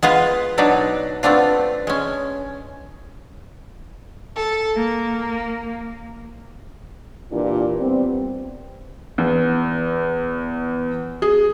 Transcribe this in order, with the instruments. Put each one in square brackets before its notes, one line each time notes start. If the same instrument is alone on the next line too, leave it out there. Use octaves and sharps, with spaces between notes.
[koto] G#3 B3 F4 B4
B2 F#3 D4 D#4 B4
A3 B3 C4 D4 F4
G#3 C#4
[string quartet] A4
A#3
[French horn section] A#2 E3 D4 F4 G4
G3 B3 C4
[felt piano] E2
G#4